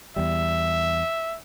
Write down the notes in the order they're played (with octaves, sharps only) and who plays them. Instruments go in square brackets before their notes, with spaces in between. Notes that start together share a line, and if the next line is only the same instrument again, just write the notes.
[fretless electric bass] E2 G3 [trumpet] E5